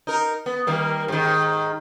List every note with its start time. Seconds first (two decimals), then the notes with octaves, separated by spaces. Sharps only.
0.07 D#4 A#4
0.46 B3
0.67 D#3 G3 A#3
1.08 G#2 D#3